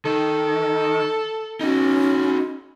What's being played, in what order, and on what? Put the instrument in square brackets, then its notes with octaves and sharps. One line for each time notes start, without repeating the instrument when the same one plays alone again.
[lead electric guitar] D#3 [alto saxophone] A4
[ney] C#4 [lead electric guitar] D#4 F#4